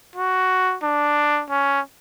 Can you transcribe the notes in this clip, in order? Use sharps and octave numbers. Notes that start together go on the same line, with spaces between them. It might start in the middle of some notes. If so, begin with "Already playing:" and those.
F#4
D4
C#4